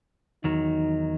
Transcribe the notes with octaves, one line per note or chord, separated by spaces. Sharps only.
E2 D#3 F#3 D#4